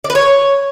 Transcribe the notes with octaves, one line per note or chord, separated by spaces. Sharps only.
D5
B4
C#5